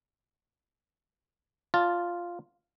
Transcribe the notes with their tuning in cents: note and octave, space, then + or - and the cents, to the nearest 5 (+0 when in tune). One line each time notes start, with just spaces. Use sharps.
F4 +0 D5 -25 A5 +0